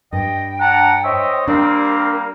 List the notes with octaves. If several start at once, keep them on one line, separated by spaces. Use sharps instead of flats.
G2 D#5 G5
D4 F#5 A5 A#5
C5 C#5 D#5 E5
G3 A#3 C4 D4 A#4